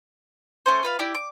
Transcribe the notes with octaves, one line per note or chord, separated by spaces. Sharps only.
A3 C#4 C5
F4 B4 F5
E4 G4 D5
D6